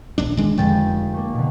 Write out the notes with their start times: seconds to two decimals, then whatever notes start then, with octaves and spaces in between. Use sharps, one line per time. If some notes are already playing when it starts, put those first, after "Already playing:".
0.18 A#1 D#2 D4
0.37 D#3 G#3 D4
0.57 F1 F2 D3 G#3 G5 A6
1.14 A3 A#3
1.34 B2 D3